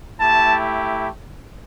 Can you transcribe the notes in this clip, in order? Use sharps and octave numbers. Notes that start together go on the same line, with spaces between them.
A3 E4 G4 A5